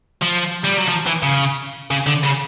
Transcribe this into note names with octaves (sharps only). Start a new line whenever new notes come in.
F3
G3
F#3
F3
E3
C#3
C#3
D3
C#3